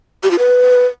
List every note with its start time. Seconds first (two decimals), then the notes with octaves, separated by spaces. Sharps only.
0.23 G4
0.31 F4
0.39 B4